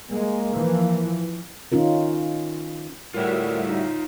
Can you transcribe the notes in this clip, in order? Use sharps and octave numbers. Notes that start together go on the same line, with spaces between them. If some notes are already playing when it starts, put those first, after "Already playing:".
G#3 A#3
E3 F3
D#3 C#4 D#4 F4 A#4
A2 G3 F4 F#4 A#4 C#5 E5
D#4